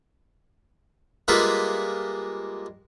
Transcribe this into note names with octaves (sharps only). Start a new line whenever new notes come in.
G3 G#3 A#3 F4 B4 E5